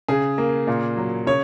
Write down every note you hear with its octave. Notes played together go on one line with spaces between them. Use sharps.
C#3 G#4
A#3
A#2
F#3
C#3 C#5